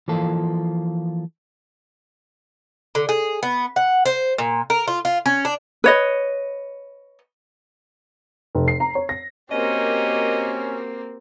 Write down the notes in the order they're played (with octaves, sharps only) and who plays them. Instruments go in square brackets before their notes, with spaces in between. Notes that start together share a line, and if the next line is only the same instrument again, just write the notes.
[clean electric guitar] E3 F3 A#3 F4 A4
[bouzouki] D3
G#4
B3
F#5
C5
A#2
A#4
F4
F4
C#4
D4
[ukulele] B4 C#5 D#5
[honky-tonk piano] F1
C7
A#5
C#5
A#6
[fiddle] A#3 C4 [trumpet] C#4 [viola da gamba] F#4 G4 A#4 [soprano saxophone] D#5